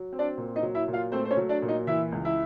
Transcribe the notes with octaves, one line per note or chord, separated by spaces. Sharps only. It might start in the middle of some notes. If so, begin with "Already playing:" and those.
Already playing: F#3
C4
D4 D5
A#2
D#4 D#5
F#3
E4 E5
A#2
F4 F5
A3 C4 C5
C5
C#4 C#5
F#3
D4 D5
A#2
D#4 D#5
E3 E4 E5
C#2
E4 E5